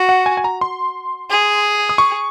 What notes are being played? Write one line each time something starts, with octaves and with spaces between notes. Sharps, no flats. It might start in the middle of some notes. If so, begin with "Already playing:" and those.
Already playing: F#4
F#5
G#5
G#5
A#5
C6
G#4
D#6
C#6